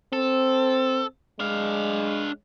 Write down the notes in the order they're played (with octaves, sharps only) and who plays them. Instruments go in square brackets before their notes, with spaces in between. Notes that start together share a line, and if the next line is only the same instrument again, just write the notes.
[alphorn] C4 [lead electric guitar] A4
[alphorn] G#3 [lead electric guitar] D4 F5